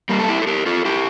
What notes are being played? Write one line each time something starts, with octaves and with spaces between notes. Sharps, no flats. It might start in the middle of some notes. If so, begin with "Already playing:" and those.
G3 A#3
A4
E4 G4
A4
G4 A#4
F4 A4
E4 G4